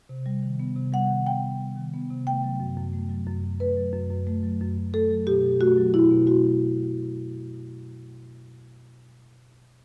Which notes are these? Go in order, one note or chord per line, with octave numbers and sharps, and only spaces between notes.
C3
G3
D#3
B3
C3
G3 F#5
D#3
B3 G5
C3
G3
D#3
B3
C3
A3 G5
F#3
F#2
F#2
A3
F#3
F#2
F#2
A3 B4
F#3
F#2
F#2
A3
F#3
F#2
F#2
A3 A4
F#3
B2 G4
B2
A3 F#4
F#3
B2 E4
B2
A3 F#4
F#3